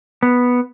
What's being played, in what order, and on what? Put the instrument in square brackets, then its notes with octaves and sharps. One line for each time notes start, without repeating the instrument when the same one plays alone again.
[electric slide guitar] B3